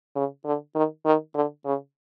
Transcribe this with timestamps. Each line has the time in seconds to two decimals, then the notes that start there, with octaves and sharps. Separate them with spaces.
0.16 C#3
0.45 D3
0.75 D#3
1.06 D#3
1.35 D3
1.66 C#3